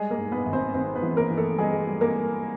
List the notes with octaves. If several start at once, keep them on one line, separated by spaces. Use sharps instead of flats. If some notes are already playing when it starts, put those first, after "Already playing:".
Already playing: G3 G#3 G#4
A#3 A#4
G#2
B3 B4
G#1
C4 C5
G#1 C4 C5
B3 B4
E3
A#3 A#4
E3
A3 A4
G3 G#3 G#4
G3
A#3 A#4